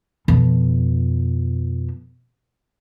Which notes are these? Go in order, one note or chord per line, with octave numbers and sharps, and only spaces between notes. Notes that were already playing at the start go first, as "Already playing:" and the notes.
F2 B2